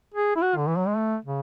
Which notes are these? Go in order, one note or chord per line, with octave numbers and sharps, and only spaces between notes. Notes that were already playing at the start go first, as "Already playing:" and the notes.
G#4
E4
F#4
D3
E3
F#3
G#3
A3
C#3